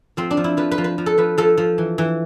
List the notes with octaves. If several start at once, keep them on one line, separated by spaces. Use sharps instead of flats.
F3 C4
D4
F3
E4
F3 B4
B4
F3
B4
F3
A4
F3 B4
F3 A4
F3
E3
E3